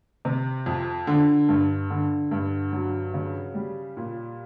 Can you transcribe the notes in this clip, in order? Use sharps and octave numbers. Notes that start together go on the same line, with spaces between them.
C3
F2
D3
G2
D3
G2
F#3
C#3
G3
A#2